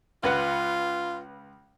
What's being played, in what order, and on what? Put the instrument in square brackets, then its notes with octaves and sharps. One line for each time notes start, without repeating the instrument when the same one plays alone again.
[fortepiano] C#2 B4 F#5 [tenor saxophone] F4